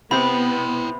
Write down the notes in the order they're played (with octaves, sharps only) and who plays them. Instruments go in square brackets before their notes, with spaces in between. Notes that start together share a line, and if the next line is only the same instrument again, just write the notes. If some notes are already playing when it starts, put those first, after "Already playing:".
[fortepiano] C3 C5 [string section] B3 [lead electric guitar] E4 G5 [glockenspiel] B5